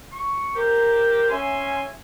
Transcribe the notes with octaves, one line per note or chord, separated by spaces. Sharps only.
C#6
G4 A#4 C5
C#4 E5 G#5 C6